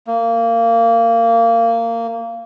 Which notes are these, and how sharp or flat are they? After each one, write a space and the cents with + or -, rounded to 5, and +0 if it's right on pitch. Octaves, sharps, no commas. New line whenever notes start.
A#3 -20